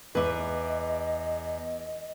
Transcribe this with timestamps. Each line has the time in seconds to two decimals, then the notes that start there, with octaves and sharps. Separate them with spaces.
0.15 E2 B4 D#5 E5 D6